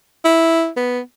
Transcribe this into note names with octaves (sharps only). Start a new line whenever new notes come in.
E4
B3